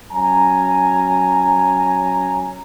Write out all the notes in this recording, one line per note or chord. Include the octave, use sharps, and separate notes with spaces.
F#3 C#4 G#5 A#5